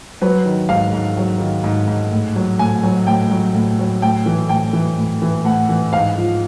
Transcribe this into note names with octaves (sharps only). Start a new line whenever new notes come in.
F#3 B4
D#3
G#2 F5
G#2
F#3
D#3
G#2
G#2
A2
F#3
A2 G#5
F#3
A2 G5
F#3
A2
F#3
A2 G5
E3
A2 G5
E3
A2
E3
A2 F#5
E3
G#2 F5
F3